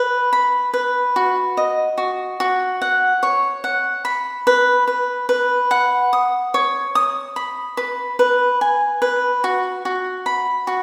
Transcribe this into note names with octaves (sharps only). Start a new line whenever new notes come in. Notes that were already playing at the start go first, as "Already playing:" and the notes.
Already playing: B4
B5
B4
F#4
D#5
F#4
F#4
F#5
C#5
F#5
B5
B4
B4
B4
F#5
D#6
C#5
D#6
B5
B4
B4
G#5
B4
F#4
F#4
B5
F#4